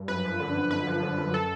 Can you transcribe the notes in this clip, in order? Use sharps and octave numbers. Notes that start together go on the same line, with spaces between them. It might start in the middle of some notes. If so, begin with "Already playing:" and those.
Already playing: G2
F#2 B4
F3
D3
F#2
F#2 B4
F3
D3
F#2
A4